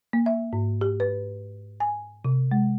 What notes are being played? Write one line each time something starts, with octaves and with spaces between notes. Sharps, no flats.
A#3
E5
G#2
G4
B4
G#5
C3
G#3